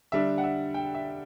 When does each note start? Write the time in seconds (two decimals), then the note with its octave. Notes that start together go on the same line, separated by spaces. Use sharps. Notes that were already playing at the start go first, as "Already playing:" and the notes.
0.12 D3 G3 D4 E5
0.38 F#5
0.44 E5
0.74 G5
0.95 E5